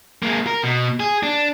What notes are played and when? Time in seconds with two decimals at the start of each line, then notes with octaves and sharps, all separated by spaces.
0.23 G#3 A#3
0.47 A#4
0.63 B2
1.00 G#4
1.23 D4